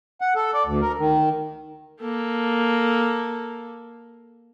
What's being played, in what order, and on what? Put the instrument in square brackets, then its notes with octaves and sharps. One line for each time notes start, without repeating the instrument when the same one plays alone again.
[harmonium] F#5
A4
D5
D2
A#4
D#3
[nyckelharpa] A#3 A4